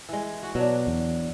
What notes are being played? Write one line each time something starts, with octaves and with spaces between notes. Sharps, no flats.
E3 G#3
F#4
B2 F#3 D4
E2